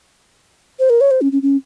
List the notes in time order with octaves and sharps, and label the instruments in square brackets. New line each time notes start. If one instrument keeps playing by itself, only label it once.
[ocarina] C5
A#4
C#5
C5
C#4
C#4
C#4